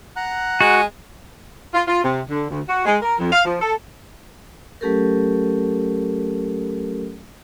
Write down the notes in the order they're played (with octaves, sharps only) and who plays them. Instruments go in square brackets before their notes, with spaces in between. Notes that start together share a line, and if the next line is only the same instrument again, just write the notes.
[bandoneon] F#5 A#5 F#6
[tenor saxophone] G#3 [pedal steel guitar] F#4 [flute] G#5
[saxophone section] F4
F4
C3
D3
D2
F#4
G#3
A#4
F2
F5
F3
A4
[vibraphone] F#3 A3 C#4 G4 A4 A#4